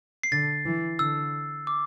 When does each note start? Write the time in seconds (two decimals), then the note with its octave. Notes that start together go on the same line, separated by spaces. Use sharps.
0.23 C7
0.32 D3 A6
0.66 E3
0.99 D3 E6
1.67 D6